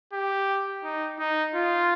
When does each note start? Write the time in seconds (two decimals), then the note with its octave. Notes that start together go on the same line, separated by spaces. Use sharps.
0.13 G4
0.84 D#4
1.19 D#4
1.55 F4